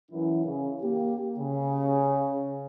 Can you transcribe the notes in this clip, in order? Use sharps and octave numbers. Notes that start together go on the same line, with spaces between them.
F#2 E3 E4
C#3
A#3 G4
C#3